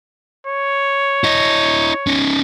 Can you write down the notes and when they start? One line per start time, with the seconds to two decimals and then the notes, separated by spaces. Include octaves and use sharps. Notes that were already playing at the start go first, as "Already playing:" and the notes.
0.46 C#5
1.24 E4 D#5
2.07 C#4 D#4